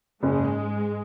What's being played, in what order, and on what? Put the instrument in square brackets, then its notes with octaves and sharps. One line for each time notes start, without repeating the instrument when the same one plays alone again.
[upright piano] F#1 [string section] G#2 G#3